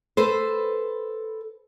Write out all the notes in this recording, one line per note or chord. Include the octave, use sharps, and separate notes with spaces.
A4 B4 C5